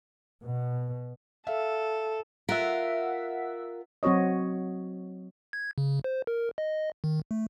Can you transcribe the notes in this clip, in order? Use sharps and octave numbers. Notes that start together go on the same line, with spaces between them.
B2
A4 E5 F5
F4 A#4 E5 F#5 B6
F#3 C4 F#4 C#5 D#5
G#6
C#3
C5
A#4
D#5
D#3
A3